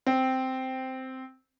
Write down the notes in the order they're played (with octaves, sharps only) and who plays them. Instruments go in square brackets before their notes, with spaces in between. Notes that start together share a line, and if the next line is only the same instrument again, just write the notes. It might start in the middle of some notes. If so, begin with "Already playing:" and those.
[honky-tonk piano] C4